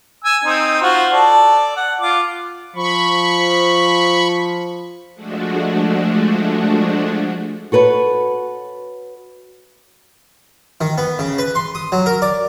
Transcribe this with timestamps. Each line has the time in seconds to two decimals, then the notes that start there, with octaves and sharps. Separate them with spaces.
0.24 G#5 E6
0.44 C4 D#4
0.82 F4 F#4 C5
1.12 A4 D5
1.76 F#5
2.01 F4 D6
2.76 F3 B5 C#6
5.15 F3 G#3 A3 D4 F#4
7.72 F#4 A4 B4 C#5
10.81 D#3
10.98 B3
11.19 C#3
11.38 B4
11.55 C6
11.75 D#6
11.92 F#3
12.06 A#4
12.22 D5